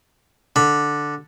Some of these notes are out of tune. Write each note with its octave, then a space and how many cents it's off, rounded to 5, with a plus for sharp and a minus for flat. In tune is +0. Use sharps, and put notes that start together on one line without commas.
D3 +0 B5 +0